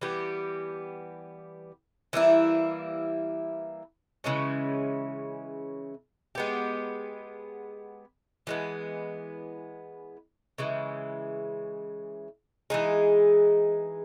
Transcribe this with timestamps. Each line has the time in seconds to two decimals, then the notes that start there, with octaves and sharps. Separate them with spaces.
0.01 E3 G3 B3 G4
2.13 E3 G3 A#3 E4
4.24 C#3 E3 G#3 C#4
6.35 G#3 B3 G4
8.47 E3 G#3 B3
10.58 C#3 E3 G#3
12.70 E3 G#3 D#4 G#4